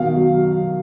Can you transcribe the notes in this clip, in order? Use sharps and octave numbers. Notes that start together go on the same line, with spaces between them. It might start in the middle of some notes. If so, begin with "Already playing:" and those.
Already playing: B2 D#3 F5
F#3